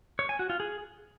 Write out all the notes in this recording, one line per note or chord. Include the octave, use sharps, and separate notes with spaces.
C#5
G#5
F#4
F4
G#4